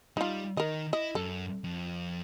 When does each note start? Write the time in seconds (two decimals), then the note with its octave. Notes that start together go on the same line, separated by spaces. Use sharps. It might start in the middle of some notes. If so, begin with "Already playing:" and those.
0.17 G3 D#4 F4
0.57 D#3 A#4 D#5
0.93 E4 D#5
1.15 F#2 A4
1.64 F2